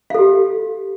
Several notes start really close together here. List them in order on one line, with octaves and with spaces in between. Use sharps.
F5 A4 G4